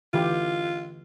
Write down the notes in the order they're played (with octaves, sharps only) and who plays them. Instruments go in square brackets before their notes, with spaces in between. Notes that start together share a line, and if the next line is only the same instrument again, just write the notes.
[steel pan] D3 E3 G4 [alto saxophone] F4